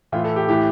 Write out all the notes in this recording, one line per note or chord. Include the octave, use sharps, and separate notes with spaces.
A2 E3 F4
A4
G4
A2 E3 G4